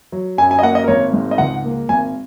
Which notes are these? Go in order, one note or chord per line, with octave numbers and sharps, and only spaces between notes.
F#3
F#2 G#5
G#5
D#5
A#3 F#5
D#5
A#4
G#1 C#5
G#2
D#5
C#2 F#5
A#3
G#1 G#5